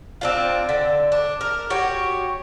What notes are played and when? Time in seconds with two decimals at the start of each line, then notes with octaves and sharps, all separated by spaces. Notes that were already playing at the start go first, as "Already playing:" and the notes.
0.21 C4 D4 F4
0.69 D3
1.12 D4
1.41 A#4
1.70 F#4 G4 C#5